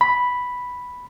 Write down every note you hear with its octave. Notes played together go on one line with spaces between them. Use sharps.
B5